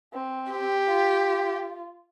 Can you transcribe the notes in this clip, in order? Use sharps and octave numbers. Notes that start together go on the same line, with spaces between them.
C4
G4
F4